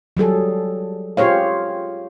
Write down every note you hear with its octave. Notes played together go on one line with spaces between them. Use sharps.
F#3 G3 G#4 A4
F4 G4 G#4 C5 C#5 F5